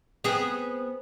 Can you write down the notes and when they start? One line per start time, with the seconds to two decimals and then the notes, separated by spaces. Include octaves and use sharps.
0.24 B3 C4 G#4